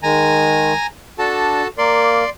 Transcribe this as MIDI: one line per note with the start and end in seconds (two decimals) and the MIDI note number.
0.03 0.73 51
0.03 0.73 56
0.03 0.87 80
0.03 0.87 82
1.19 1.62 62
1.19 1.68 66
1.19 1.68 69
1.19 1.68 81
1.78 2.24 58
1.78 2.24 70
1.78 2.30 74
1.78 2.30 84